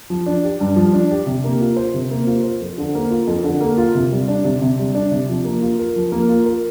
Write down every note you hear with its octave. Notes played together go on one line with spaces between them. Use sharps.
F3
D4
G4
G2
F3
D4
G4
C3
A#3
F4
C5
C3
A#3
F4
C5
F2
D3
A#3
F4
F2
D3
A#3
F4
C3
G3
D4
C3
C3
G3
D4
C3
F3
A#3
F4
A#4
F3
A#3
F4
A#4